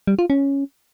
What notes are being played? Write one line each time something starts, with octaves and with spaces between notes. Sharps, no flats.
G3
F4
C#4